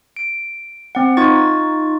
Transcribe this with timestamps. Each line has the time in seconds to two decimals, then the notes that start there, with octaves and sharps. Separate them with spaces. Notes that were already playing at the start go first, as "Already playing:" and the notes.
0.16 D7
0.95 C4 F#5
1.17 D#4 F4 C#6 A6